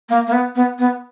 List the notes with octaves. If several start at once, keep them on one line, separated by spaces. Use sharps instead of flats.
A#3
A#3
B3
B3
B3